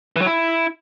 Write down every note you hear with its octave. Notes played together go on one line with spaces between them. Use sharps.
E3
F#3
E4